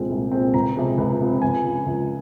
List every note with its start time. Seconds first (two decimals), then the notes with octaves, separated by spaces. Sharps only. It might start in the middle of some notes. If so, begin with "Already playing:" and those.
Already playing: C2 A#2 G#3 C4
0.10 C2
0.31 A#2 G#3 C4
0.54 C#2 A#5
0.75 C3 F3 G#3 C4
0.98 C#2
1.20 C3 F3 G#3 C4
1.42 C#2 G#5
1.64 C#3 F3
1.87 C#2